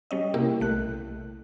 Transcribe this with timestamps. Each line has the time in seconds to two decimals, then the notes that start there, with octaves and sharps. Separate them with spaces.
0.11 G3 C#4 D#5
0.34 C3 A#3 E4 G4 A#4
0.60 B1 A3 F#6